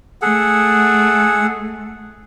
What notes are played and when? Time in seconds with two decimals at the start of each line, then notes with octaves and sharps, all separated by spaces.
0.22 A3 G#4 A4 F#5